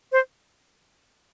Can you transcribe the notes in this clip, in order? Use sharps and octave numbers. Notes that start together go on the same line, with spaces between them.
C5